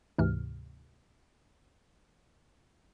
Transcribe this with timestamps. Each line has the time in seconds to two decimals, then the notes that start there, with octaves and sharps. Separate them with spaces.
0.18 D2 G#2 C3 E3 F6